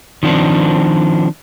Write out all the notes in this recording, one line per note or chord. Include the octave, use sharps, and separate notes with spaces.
D#3 F3 C4 D4